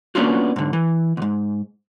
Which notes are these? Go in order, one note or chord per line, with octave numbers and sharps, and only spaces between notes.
A#3 B3 C#4 D4 F4 F#4
G#2 D3
E3
D2 G#2